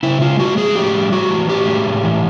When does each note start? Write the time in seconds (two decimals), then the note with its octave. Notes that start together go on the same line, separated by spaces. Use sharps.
0.03 C#3 E4
0.21 G#3 F4
0.39 C#3 F#4
0.57 F3 G#4
0.76 A2 G4
0.94 G3
1.12 A2 F#4
1.31 E3
1.49 A2 G4
1.68 G#3
1.86 A2
2.04 E3